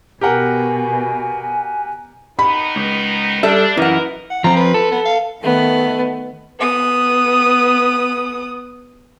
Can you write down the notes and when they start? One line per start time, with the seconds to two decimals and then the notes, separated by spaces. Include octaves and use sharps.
0.21 B2 G4 A#4 F#5 G#5
2.39 D#3 B3 D#4 B5
2.76 C#2
3.43 G3 D4 A4 E5
3.77 F#2 E3 D#4 E4 A#4 F#5
4.30 F#5
4.44 F3 C4 A#5
4.57 B4
4.74 A4
4.92 B3
5.05 F5
5.41 D#3 A3 B3
6.59 B3 D#6